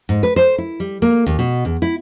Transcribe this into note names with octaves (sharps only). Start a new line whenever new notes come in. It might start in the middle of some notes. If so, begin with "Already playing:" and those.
G#2
B4
C5
E4
G3
A#3
D#2
B2
E2
E4